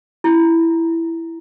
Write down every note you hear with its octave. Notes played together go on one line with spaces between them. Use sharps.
E4